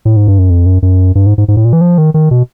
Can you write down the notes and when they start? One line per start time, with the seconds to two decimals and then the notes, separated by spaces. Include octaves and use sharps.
0.05 A2
0.16 G#2
0.28 G2
0.39 F#2
0.50 F2
0.66 F#2
0.82 F#2
1.15 G2
1.26 G#2
1.38 G#2
1.48 G#2
1.57 A2
1.65 A#2
1.73 E3
1.81 F3
1.98 D#3
2.14 D#3
2.31 B2